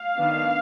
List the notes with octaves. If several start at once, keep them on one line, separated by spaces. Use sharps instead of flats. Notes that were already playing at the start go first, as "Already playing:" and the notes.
Already playing: F5
D#3 B3 D4